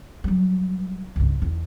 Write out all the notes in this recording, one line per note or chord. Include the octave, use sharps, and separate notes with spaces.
F#3 G3
C#2 G2
E2 D#3